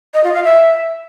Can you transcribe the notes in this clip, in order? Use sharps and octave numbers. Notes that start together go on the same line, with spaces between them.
D#5
F4
F5
E5